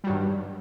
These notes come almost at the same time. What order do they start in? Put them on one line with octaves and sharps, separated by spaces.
G3 F#3 G2 D#3